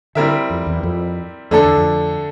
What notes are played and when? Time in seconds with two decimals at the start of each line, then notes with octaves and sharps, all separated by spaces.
0.15 D3 G3 C4 E4 A#4 E5
0.50 F2
0.66 E2
0.83 F2
1.51 F2 D3 A3 D4 A4
1.64 E2
1.77 F2